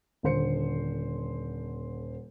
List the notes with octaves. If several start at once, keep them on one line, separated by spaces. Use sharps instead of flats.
D#1 D3 C5 C#7